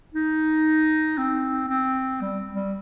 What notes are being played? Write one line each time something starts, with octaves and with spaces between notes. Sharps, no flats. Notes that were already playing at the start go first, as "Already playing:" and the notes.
D#4
C4
C4
G3
G3